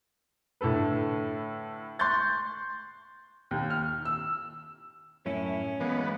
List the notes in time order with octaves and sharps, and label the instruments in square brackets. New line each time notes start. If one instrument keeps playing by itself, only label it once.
[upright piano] A2 D3 A4 B4
C6 C#6 F#6 G6 A6
D#2
F6
E6
[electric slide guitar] F#2 A2 E4 [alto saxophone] C#4
[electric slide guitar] E3 G#3 A#3 [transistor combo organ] B3